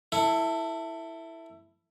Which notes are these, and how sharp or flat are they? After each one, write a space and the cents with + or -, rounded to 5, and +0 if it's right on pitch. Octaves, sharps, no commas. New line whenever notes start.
E4 +0 A4 +20